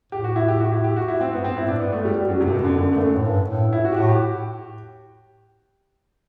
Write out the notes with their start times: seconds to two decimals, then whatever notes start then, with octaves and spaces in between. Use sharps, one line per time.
0.12 A2 G4
0.24 F#4
0.36 E4
0.48 G4
0.60 F#4
0.72 E4
0.84 G4
0.96 F#4
1.08 E4
1.21 C4
1.32 G2 B3
1.44 C4
1.56 G2 E4
1.66 A2 D4
1.75 G2 B3
1.92 A3
2.05 G3
2.17 G3
2.29 F#2 F#3
2.40 G2 C3
2.52 B2
2.60 F#2 D3
2.77 F#2 D3
2.93 G2 A3
3.01 F#2
3.16 A2
3.25 G2
3.49 A2
3.73 E4
3.85 F#4
3.92 G4
3.97 A2 F#4
4.09 G4